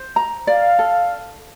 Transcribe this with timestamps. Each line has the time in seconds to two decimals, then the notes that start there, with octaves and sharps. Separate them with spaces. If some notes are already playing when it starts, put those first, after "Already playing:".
Already playing: C5
0.16 A#5
0.47 D5 F5
0.79 A4